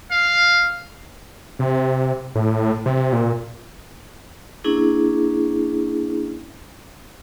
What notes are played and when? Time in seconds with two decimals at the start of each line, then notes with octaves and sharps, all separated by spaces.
0.11 F5
1.59 C3
2.35 A2
2.86 C3
3.13 A#2
4.64 A#3 C#4 D4 E4 G#4